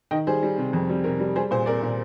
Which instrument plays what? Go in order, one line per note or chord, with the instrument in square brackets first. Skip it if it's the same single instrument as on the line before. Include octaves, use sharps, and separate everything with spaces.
[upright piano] D#3 D#5 G5
G3 G#4 C5
G3
C3
F2
G3
C3 A#4
G3
G3 G#4 C5
A#2 G#4 C5
C4 A#4 D5
A#2